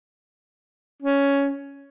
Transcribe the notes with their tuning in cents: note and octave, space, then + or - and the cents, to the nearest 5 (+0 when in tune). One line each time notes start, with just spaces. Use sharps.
C#4 +10